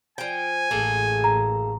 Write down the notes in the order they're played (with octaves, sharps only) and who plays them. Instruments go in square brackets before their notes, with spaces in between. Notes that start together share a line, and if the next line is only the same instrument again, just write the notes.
[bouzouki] F3 G5 [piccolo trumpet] G#5
[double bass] A1 [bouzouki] A#3 G#4 A4
[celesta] A#5